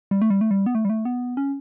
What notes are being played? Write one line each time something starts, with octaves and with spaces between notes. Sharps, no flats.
G3
A3
G3
A3
G3
B3
A3
G3
A3
B3
C#4